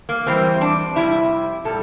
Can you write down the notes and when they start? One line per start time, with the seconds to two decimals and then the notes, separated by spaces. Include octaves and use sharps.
0.09 A#3
0.26 E2 E3 G3 C4
0.61 D4
0.96 F2 C3 G3 E4
1.65 A#2 G3 A4